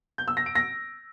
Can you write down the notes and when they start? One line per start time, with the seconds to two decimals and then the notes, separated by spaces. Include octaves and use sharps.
0.18 G6
0.28 E6
0.37 A#6
0.46 D7
0.55 A#6